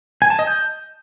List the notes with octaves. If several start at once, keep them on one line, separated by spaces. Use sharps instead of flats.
G#5
A5
D#5
G6